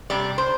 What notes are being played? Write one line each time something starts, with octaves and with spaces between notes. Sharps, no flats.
C3 G3 D5
C5